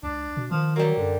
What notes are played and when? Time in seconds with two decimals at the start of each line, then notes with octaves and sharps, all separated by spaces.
0.03 C#2 D4
0.37 B2
0.51 D#3 F3
0.76 F#3 G3 A#3
0.98 F#2 D3